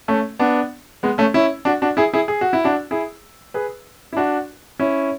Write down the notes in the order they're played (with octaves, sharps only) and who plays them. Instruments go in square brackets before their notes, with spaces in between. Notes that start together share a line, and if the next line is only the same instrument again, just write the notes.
[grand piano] A3 C#4
B3 D4
G#3 B3
A3 C#4
C#4 E4
D4 F#4
D4 F#4
E4 G#4
E4 G#4
G#4
F#4
E4
D4 F#4
E4 G#4
G#4 B4
E4
D4 F#4
C#4 E4